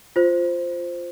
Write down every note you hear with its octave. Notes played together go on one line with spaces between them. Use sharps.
F4 C5